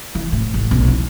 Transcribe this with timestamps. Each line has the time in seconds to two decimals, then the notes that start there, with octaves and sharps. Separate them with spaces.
0.15 E3
0.32 A2
0.54 A1
0.71 B1
0.88 E3